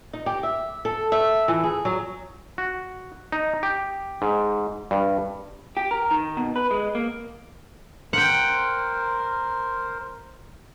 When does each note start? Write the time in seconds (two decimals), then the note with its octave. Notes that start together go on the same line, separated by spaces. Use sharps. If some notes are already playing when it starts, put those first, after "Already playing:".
0.13 D#4
0.26 G4
0.43 E5
0.85 A4
1.12 E5
1.48 E3
1.64 G#4
1.85 F#3
2.58 F#4
3.32 D#4
3.63 G4
4.22 G#2
4.91 G2
5.77 G4
5.91 A#4
6.11 D#3
6.37 B2
6.56 B4
6.71 G#3
6.95 A#3
8.13 A#4 C5 F#5 G5